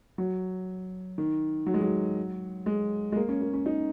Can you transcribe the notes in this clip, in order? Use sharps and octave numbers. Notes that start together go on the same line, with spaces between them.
F#3
D#3
F#3
G#3
F#3
G#3
G#3
A#3
C#4
A#3
C#4
D#4